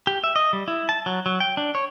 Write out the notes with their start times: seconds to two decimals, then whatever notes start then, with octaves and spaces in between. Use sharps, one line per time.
0.07 G4
0.24 E5
0.36 D#5
0.53 G3
0.68 E4
0.89 A5
1.06 F#3
1.26 F#3
1.40 G5
1.57 D4
1.75 C#5